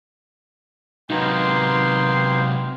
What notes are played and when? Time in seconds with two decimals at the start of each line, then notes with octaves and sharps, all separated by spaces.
1.10 C3 F#3 A#3 B3 D#4 G5 C6